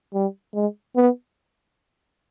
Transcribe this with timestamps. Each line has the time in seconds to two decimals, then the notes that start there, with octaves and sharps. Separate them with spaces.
0.14 G3
0.54 G#3
0.96 B3